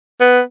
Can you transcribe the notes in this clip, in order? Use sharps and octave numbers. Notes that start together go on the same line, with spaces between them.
B3